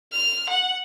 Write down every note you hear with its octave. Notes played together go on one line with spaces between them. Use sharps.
F6
F#5